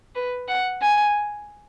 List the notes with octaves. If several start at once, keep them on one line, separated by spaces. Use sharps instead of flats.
B4
F#5
G#5